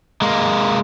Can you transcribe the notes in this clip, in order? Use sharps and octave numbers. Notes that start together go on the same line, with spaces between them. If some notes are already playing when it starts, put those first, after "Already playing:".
G#3 A#3